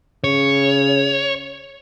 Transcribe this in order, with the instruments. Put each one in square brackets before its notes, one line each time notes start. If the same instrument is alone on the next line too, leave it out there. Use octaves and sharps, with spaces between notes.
[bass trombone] C#3 [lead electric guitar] C#5